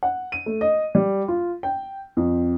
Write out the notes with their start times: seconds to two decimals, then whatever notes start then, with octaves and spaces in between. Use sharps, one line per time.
0.03 F#5
0.32 D#7
0.46 A3
0.61 D#5
0.95 G3
1.28 F4
1.63 G5
2.17 F2